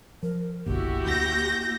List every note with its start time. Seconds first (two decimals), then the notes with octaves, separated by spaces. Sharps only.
0.23 F3 A#4
0.66 F#1 B1 D3 A#3 E4 F#4 G4
1.06 D2 G6 A#6